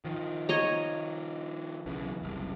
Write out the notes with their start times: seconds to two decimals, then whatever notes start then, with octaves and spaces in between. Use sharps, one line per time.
0.05 D#3 F3
0.49 C#5 D#5 A#5
1.86 B1 C#3 E3
2.22 F#1 C2